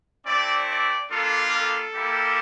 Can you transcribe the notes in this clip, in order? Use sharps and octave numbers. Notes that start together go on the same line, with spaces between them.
A3 C4 E4 D5
D5
G3 A#3 D4 F4 A4
A4
G3 A#3 E4 G4